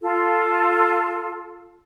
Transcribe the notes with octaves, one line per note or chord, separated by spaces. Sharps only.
F4 A4